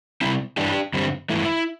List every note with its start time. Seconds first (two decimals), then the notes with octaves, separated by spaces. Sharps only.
0.21 C3 G3 C4 E4
0.57 G2 E3 G3 D4 G4
0.94 G2 D3 G3 C4
1.30 G2 E3 A3 E4